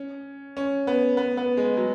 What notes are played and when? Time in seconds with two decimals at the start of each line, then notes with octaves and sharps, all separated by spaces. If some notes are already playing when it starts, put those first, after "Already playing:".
Already playing: C#4
0.57 C#4
0.87 B3
1.17 B3
1.37 B3
1.57 G#3
1.77 F#3